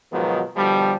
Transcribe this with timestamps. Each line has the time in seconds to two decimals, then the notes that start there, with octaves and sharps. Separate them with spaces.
0.13 G#2 B2 D#3 F3 F#3 B3
0.56 B2 D3 F3 G3